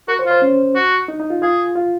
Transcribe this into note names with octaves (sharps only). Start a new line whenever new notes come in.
F#4 A#4
C5
F4
C5
C#4
F#4
D#4
D#4
F4
F4 G#4
F4